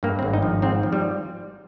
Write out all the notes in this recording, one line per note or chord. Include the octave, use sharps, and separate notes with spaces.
G2 A#3
C4
G#1
D#4
F3
G#2 C4
F3
G3